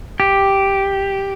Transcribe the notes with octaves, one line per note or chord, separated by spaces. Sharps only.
G4